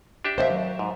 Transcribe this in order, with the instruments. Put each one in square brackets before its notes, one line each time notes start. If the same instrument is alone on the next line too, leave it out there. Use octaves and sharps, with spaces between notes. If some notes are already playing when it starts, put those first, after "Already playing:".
[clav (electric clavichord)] D4 G4 E5
[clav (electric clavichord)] D#2 [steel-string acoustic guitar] C5 D5 E5
[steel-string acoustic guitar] F#3
[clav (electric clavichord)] G#2